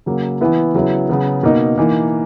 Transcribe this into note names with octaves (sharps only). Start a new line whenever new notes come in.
C#3 F#3 A#3
E3 B3 E4
C#3 F#3 B3 E4
C#3 F#3 B3
B2 A#3 D#4
E3 A#3 D#4